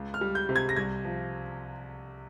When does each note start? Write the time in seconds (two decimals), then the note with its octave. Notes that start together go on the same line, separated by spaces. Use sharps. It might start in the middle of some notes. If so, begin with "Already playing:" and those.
Already playing: C#2
0.14 F6
0.21 G3
0.35 G6
0.49 C3
0.56 G#6
0.69 A#6
0.76 C2 G#6
1.04 F3